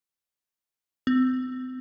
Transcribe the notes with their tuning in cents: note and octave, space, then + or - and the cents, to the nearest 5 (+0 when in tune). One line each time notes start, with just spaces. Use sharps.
C4 -35